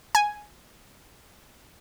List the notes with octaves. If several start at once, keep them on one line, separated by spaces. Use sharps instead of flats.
G#5